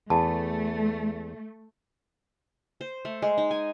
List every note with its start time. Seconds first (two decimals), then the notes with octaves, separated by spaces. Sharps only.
0.10 E2 A3 A5
2.81 C5
3.05 A3
3.22 G#3
3.38 D#4
3.51 G#5